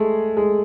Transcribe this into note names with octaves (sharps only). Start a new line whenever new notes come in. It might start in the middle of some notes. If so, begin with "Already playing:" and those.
Already playing: G#3 A3
G#3